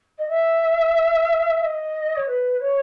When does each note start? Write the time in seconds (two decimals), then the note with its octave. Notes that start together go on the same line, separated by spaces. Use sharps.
0.18 D#5
0.28 E5
1.60 E5
1.63 D#5
2.15 C#5
2.26 B4
2.60 C#5